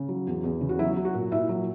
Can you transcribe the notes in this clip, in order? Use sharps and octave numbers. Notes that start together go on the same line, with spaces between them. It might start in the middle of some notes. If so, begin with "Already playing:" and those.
Already playing: C#3
F#3
E2
E2
C#3
F#4
F#3 E4
F#3
F#4
A#2
A#2 E4 E5
F#3